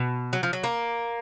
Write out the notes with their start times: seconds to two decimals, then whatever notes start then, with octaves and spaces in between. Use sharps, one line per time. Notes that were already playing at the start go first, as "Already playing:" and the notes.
Already playing: B2
0.33 F#3
0.43 F3
0.53 F#3
0.64 A#3